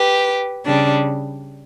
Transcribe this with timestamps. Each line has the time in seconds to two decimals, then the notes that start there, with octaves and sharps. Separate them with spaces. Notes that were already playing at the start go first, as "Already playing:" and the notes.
Already playing: G4 B4
0.63 C#3 G3 D4